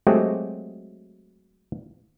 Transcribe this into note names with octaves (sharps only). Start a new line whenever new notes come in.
F#3 G#3 A3 C4 F#4 G4